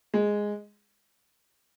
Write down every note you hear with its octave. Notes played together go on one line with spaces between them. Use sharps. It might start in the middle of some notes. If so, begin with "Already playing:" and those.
G#3